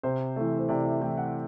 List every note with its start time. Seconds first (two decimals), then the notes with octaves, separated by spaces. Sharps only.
0.03 C3 C5
0.36 E3 A3
0.59 C5
0.69 C3 D5
0.85 E5
1.01 E3 A3 G5
1.18 F#5